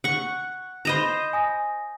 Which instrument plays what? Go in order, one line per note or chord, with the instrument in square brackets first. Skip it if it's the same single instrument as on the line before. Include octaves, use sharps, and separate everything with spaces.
[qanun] F#5 C#6
[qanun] C5 D#5 A#5 [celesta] B5 A#6 E7
[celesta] G#5 D#6 A#6